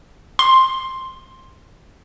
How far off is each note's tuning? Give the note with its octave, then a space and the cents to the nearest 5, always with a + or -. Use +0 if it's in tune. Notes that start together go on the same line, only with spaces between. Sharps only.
C6 +10